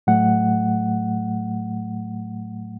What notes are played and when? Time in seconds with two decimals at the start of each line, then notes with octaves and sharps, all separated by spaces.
0.07 A2 F#3 A3 F#5